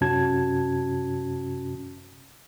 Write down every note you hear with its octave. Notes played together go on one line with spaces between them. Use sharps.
F#2 C3 C#4 F#4 A5 G#6